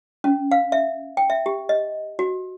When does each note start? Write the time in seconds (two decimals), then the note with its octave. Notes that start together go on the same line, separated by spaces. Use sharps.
0.24 C#4
0.51 F5
0.72 E5
1.17 G5
1.30 E5
1.46 G4
1.69 D#5
2.19 F#4